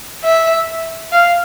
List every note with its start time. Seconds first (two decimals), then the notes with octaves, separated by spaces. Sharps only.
0.24 E5
1.12 F5